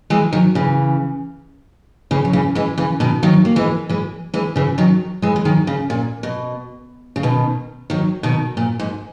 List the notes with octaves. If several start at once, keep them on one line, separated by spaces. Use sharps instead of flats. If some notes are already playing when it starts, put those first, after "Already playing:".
E3 G#3
D#3 F#3
C#3 E3
C#3 E3
F#3
C#3 E3
E3 G#3
C#3 E3
B2 D#3
D#3 F#3
A#3
E3 G#3
E3 G#3
E3 G#3
C#3 E3
D#3 F#3
E3 G#3
G#3
D#3 F#3
C#3
A#2
B2
C#3
B2 D#3
D#3 F#3
B2 D#3
A#2
G#2